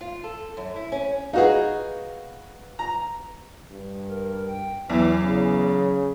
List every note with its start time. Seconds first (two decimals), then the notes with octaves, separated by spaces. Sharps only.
0.01 F4
0.24 A4
0.57 F#2
0.76 E4
0.92 C#4
1.33 D#4 F#4 G#4 B4 F5
2.79 A#5
3.71 G2
4.09 A#4
4.47 G5
4.90 E2 E3 F#3
5.22 C#3